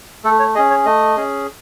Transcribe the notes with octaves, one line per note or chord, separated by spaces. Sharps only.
A3 A4
C#5
C#4 G#4 D#5
C#5
A3 D#5
C#4 G#4